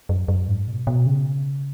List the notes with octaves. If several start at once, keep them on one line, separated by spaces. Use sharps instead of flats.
F#2
F#2
G#2
B2
B2
C#3